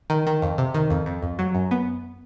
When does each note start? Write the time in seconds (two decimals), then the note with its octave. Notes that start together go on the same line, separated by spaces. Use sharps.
0.10 D#3
0.27 D#3
0.42 F2
0.58 C3
0.74 D#3
0.90 F2
1.06 F2
1.23 F2
1.39 F#3
1.55 F#2
1.71 B3